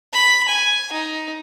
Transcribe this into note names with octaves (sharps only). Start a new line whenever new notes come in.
B5
G#5
D#4